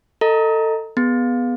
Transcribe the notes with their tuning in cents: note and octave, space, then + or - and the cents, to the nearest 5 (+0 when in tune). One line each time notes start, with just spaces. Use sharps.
A4 +20 D#5 +0 A#5 +0
B3 +0 G#4 +0